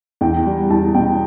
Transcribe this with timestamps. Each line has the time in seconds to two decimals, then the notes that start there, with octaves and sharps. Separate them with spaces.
0.21 E2 G5
0.46 G3
0.70 E2 A5
0.95 B2 G5